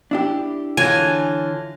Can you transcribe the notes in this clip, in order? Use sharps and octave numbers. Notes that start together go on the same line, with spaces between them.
D4 E4 G4
D3 E3 F4 C#5 G#5 F#6 A#6